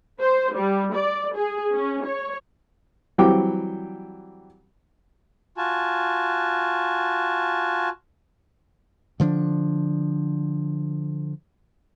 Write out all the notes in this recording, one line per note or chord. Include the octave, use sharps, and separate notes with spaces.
C5
G3
D5
G#4
C#4
C#5
E3 F#3 G3 C4 G5 D6
F4 F#4 G#5 A5
D3 F3 A3 D4